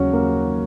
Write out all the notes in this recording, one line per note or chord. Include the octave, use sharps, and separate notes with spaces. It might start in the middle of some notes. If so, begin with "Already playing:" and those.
Already playing: D#2 C#3 F#3 C#4 F#4
A#3